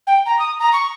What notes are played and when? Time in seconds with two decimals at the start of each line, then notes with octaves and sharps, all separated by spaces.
0.07 G5
0.26 A#5
0.39 D#6
0.59 A#5
0.73 C#6